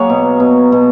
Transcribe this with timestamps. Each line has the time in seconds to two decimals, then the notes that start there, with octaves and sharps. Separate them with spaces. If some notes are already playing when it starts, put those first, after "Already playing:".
Already playing: F#3 A#3 F#4 G#4 C#5
0.10 B2
0.40 B2
0.72 B2